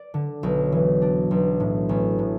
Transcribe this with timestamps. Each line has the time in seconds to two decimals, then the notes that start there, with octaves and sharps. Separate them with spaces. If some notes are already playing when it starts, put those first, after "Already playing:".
Already playing: D5
0.14 D3
0.43 B1
0.72 E3
1.02 D4
1.31 B1
1.60 A2
1.89 A1
2.19 A2